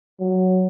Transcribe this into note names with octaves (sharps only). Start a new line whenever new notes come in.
F#3